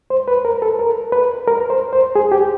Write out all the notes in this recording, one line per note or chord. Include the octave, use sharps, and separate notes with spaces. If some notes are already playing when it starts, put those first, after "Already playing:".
C5
B4
A#4
A4
A#4
B4
A#4
C5
C5
G#4
G4